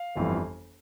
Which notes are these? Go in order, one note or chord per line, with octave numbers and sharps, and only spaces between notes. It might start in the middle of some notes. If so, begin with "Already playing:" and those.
Already playing: F5
G1 F2 E3 G3